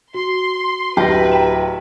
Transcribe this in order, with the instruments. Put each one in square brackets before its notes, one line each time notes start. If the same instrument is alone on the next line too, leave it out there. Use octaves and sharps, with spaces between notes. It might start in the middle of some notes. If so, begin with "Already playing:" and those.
[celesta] F#4 [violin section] C6
[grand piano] D1 A#6 [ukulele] G4 [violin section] B4
[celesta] G5 A#5 E7